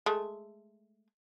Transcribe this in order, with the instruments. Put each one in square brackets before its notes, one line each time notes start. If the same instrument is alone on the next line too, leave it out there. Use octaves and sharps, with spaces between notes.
[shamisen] G#3 A3